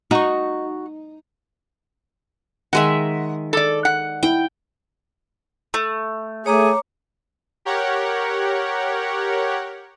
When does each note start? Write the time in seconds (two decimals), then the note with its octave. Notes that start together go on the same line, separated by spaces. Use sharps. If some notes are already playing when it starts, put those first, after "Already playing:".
0.11 D#4 F#4 C#6
2.73 D#3 G#3 E5 F#5
3.53 A4 D5
3.85 F#5
4.23 E4 G5
5.74 A3
6.46 A3 G#4 C#5 A#5 D6
7.65 G4 A#4 C#5 F#5